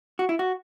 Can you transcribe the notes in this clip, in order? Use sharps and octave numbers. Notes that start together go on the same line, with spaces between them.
F#4
E4
F#4